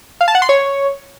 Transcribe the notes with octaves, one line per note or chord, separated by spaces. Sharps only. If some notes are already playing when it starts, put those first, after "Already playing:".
F5
A5
F#5
C6
C#5